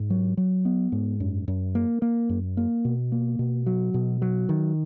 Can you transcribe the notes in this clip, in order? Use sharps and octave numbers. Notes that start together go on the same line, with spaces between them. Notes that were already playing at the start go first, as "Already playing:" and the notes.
Already playing: G#2
F#3
F#3
B3
G#2
F#2
F#2
A#3
A#3
F#2
A#3
B2
A#3
B2
F#3
B2
F#3
D#3